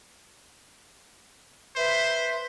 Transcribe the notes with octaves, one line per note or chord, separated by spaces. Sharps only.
B4 C5 E5